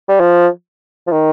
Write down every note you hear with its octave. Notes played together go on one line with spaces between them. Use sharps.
G3
F3
F3
D#3